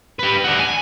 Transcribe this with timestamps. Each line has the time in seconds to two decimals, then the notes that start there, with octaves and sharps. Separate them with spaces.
0.19 G4 B4
0.44 D4 F#4
0.60 G#5